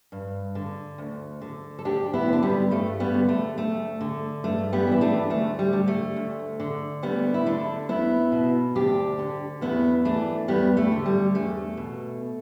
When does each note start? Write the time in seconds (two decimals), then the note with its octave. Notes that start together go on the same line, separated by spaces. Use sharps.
0.12 G2
0.55 D3
0.98 D2
1.41 D3
1.79 A4
1.85 D2 D4 G4
2.13 B3 E4
2.28 D3 D4
2.42 G3 B3
2.71 G2 A3
3.00 G3 B3
3.14 D3
3.29 A3
3.57 D2 A3
4.01 D3
4.44 G2 A3
4.73 G3 B3
4.87 E3 E4
5.01 A3 D4
5.30 D2 A3
5.59 G3
5.73 D3
5.88 A3
6.16 D2
6.60 D3
7.03 D2 G3 B3
7.34 E4
7.46 D3 A3 D4
7.89 E2 B3 E4
8.32 B2
8.75 D2 D4 G4
9.19 D3
9.61 E2 B3 E4
10.05 E3 A3 D4
10.48 E2 G3 B3
10.77 A3
10.92 D3
11.06 G3
11.35 E2 A3
11.77 B2